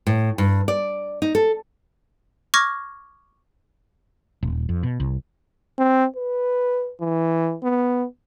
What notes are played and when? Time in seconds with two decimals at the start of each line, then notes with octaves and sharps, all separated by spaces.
0.07 A2
0.38 G2
0.68 D5
1.22 D#4
1.35 A4
2.54 C#6 D6 F6 G#6 A#6
4.43 D#1
4.69 F2
4.83 B2
5.00 C2
5.79 C4
6.16 B4
7.01 E3
7.63 B3